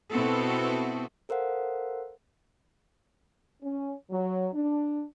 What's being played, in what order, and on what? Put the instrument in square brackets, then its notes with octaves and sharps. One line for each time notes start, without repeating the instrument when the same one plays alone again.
[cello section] B2 B3 C4 E4 F#4 A4
[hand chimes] A4 A#4 C5 F5 F#5
[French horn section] C#4
F#3
D4